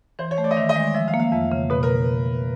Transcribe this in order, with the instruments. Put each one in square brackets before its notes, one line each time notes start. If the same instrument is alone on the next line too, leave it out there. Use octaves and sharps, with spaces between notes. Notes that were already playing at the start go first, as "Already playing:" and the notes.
[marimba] E3 [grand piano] C5
[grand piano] C#5
[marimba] A3
[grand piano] D5
D#5
[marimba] D#3 [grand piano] E5
[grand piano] D#5
[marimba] G#3
[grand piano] D5
[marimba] F3 [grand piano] E5
[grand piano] F5
[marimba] A#3
[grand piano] F5
[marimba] F2 [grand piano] E5
[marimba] C#3
[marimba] B2 [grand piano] B4
[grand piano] A#4